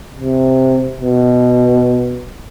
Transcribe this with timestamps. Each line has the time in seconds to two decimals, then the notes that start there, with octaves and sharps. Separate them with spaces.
0.20 C3
1.01 B2